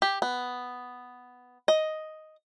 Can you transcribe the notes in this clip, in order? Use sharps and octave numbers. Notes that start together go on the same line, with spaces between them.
G4
B3
D#5